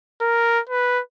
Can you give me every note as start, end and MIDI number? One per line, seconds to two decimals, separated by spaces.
0.21 0.60 70
0.69 1.01 71